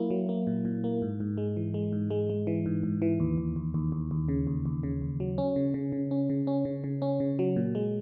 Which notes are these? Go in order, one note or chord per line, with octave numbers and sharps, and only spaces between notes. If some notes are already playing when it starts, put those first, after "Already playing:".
Already playing: F#3 A#3 E4
F#3
A#3
A#2
A#2
A#3
G#2
G#2
G#3
E3
G#3
G#2
G#3
G#3
E3
G#2
G#2
E3
D#2
D#2
D#2
D#2
D#2
D#2
C#3
D#2
D#2
C#3
D#2
F#3
C#4
C#3
C#3
C#3
C#4
C#3
C#4
C#3
C#3
C#4
C#3
F#3
A#2
G#3